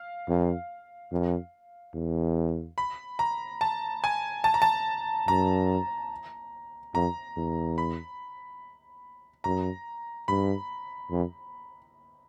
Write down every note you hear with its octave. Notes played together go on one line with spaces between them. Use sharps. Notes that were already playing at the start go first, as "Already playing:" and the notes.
Already playing: F5
F2
F2
E2
B5
A#5
A5
G#5
A5
A#5
A5
F#2 A#5
F2 A#5
E2
B5
F#2 A#5
G2 B5
F2